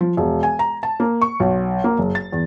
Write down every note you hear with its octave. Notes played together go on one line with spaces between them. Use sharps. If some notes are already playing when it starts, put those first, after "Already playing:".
F3
E1
G#5
A#5
A5
A#3
C#6
B1
A#3
F#1
A6
E2